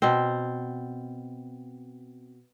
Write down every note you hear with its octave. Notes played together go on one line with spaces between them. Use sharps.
B2 C4